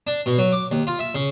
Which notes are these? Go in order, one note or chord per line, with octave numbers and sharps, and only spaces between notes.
D4
B2
F#3
D6
D#2
F4
E5
C#3